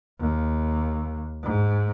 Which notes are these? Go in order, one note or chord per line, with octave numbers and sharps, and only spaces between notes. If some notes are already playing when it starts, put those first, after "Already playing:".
D#2
G#2